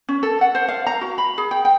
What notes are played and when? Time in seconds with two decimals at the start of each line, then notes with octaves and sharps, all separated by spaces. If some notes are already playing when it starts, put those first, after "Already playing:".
0.09 C#4
0.23 A4
0.41 F#5
0.55 C5
0.69 F5
0.87 A#5
1.01 F#4
1.18 B5
1.38 G#4
1.51 G5
1.65 G5